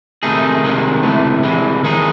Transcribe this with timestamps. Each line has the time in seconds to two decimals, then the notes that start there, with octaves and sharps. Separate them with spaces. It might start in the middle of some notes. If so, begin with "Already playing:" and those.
0.23 C3 D#3 A3 D#4 G#4
0.63 C2 C3 D#3 G#3
1.03 C#2 C3 E3 A3
1.43 C2 C3 E3 G#3
1.83 D#2 D#3 G#3 D#4 G#4